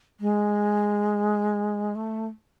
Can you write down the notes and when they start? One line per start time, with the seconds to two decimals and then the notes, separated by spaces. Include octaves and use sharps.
0.20 G#3
1.95 A3